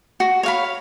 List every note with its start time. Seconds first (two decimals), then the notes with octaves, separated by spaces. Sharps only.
0.20 F#4
0.43 C#5 F5 B5